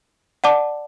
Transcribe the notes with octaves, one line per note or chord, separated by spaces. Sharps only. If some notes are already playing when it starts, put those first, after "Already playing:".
D5 F#5 A5 D6